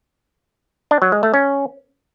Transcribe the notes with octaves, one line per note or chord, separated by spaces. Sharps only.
D4
F#3
G#3
A3
C#4